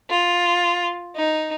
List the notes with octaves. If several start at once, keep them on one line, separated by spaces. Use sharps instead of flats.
F4
D#4